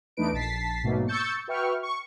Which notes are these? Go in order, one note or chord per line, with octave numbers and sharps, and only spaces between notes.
E2 A3 D4 D#4 B4 D7
A#1 A5 A6 B6 C7
G#2 B2 F#3 A3 A#3
C#6 E6 G6 A6 C#7
F#4 B4 E5 G5 C#6 F6
C#6